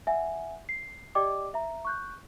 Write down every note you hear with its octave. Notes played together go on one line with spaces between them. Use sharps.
E5 F#5 G#5
C7
G4 D5 D#5 G5 D6
E5 A#5
C#6 F#6 G6